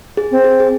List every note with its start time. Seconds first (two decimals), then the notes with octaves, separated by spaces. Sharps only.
0.17 G#4
0.31 C4
0.44 G#4
0.60 G#4